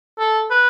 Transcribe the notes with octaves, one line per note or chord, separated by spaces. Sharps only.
A4
B4